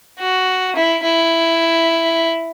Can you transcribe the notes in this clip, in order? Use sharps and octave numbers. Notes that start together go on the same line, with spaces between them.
F#4
E4
E4